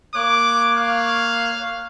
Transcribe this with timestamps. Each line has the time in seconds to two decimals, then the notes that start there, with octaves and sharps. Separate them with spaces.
0.15 A#3 C#5 D6 F#6
0.76 F5